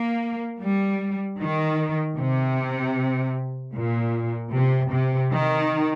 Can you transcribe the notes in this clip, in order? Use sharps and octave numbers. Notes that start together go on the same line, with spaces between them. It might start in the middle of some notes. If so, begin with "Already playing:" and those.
Already playing: A#3
G3
D#3
C3
A#2
C3
C3
D#3